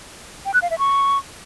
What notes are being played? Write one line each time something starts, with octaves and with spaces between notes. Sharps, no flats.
G5
F#6
F5
E5
C#6